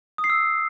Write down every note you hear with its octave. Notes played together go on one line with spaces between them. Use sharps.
D#6
C7
E6